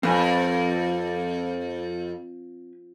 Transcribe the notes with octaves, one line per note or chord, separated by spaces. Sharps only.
F2 C4 B4 G#5